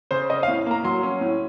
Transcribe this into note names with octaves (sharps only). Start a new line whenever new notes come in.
C#3 C5
C#4 D#5
F5
A2
A#3 A#5
F#3 C6
C#4
A2